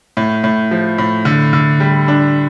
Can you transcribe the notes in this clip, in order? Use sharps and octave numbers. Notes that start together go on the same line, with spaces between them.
A2
A2
F3
A2
D3
D3
G3
D4